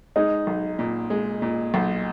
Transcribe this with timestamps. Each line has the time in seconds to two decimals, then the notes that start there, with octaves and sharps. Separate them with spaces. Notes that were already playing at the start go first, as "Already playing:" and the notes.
0.16 G#3 D#4
0.47 B1
0.79 A#2
1.10 G#3
1.42 A#2
1.74 B1